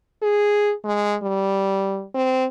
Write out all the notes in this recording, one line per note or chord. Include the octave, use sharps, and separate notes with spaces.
G#4
G#3
G3
C4